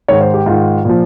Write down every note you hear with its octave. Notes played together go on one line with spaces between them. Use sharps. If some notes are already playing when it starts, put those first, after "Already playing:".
G#2 D#3 C#5
C5
G4
G#2 D#3 F4
A#2 F3